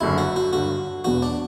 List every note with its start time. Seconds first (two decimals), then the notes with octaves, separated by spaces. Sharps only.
0.01 F#1 F#2 D3 E4
0.18 F#4
0.36 F#4
0.53 G2 D3 F#3 F#4
1.04 E1 E2 B2 F#4
1.22 D4